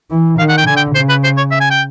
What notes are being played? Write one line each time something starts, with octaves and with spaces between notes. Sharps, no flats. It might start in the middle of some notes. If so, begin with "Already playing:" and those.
E3
D#3 F5
F#5
G5
D3 G#5
G5
C#3 C5
B4
C5
C#5
E5
G#5
G5